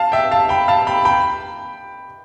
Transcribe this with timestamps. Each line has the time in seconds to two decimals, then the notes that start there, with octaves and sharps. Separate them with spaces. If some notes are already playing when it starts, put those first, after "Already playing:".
Already playing: F5 A5
0.12 E5 G5
0.31 F5 A5
0.49 G5 B5
0.68 F5 A5
0.87 G5 B5
1.05 G5 B5